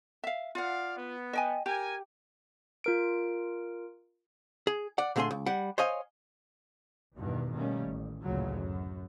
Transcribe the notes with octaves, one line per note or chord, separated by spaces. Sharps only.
E5 F5
F4 D5 F5 F#5
B3
D#5 G5 G#5
G4 A#4 G#5
F4 A#4 D7
G#4
D5 F#5
A#2 D3 A3 G#4 G#5 C6
C#2
G3 F#5
C5 C#5 D#5 F5 G#5
E2 G2 B2 D#3
B2 D#3 G3 A3 A#3 C#4
A1
A1 D2 A#2 C#3 F#3
F#2